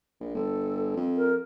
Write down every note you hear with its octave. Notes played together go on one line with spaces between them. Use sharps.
A#1
G1 A4
F2
A#4